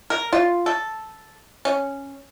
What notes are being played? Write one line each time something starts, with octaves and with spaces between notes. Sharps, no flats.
A#4
F4
A4
C#4